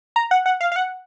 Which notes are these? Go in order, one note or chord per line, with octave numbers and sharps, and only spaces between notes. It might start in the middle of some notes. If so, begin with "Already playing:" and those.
A#5
F#5
F#5
F5
F5
F#5